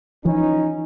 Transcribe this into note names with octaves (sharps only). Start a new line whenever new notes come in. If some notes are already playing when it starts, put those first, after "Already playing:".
E3 F3 C#4 D#4